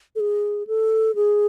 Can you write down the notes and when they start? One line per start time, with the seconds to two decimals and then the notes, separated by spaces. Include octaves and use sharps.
0.15 A4
0.20 G#4
0.67 A4
1.15 G#4